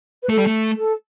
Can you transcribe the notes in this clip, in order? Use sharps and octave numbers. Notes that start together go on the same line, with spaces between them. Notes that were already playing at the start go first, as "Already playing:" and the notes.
B4
A3 A4
G3
A3
A4